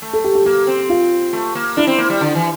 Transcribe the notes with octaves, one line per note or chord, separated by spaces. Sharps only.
A3
A4
G4
G4
A#3 G4
C4
F4
A3
A#3
D4 E4
C4
A#3
G3
D3
E3